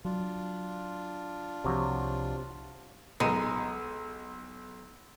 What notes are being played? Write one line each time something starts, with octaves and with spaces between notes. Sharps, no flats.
F#3 D4 F4
C2 C3 F3 F#4 C#5
B1 G#3 D#4 D#5